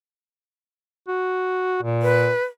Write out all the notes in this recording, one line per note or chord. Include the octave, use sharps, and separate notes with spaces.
F#4
A#2
B4